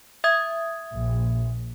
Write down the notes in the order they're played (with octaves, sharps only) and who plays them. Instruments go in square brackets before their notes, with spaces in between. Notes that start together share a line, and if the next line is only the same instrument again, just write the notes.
[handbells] E5 D#6 G#6
[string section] A#1